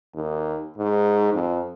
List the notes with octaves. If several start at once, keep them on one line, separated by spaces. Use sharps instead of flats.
D#2
G#2
F2